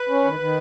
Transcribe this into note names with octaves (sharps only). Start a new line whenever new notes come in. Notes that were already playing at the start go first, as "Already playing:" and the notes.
Already playing: B4
C#4
D#3
D#3